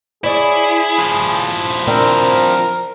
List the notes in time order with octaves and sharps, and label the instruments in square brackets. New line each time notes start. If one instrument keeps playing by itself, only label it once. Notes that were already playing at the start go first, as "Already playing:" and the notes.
[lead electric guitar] E4 [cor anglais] G#4 [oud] C#5 D5
[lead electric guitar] F3 E4
[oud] C4 D4 [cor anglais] A#4